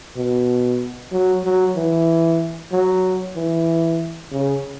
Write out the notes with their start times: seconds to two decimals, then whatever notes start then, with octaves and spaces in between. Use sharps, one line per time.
0.17 B2
1.12 F#3
1.44 F#3
1.76 E3
2.72 F#3
3.36 E3
4.32 C#3